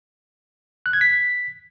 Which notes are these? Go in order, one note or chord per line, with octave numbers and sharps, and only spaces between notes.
F#6
G#6
B6